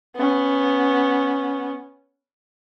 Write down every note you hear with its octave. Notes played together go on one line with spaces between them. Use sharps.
B3 C#4